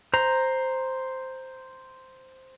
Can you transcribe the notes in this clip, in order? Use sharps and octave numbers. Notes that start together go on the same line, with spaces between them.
C5 A#5